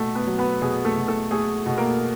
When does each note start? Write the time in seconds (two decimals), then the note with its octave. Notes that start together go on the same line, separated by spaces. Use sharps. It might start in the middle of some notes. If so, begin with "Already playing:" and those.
Already playing: B2 A3 A4
0.15 B3 B4
0.27 F#3
0.38 B3 B4
0.61 B2 G#4
0.85 A3 A4
0.97 B2
1.08 A3 A4
1.31 A3 G#4
1.66 B2
1.78 A#3 A#4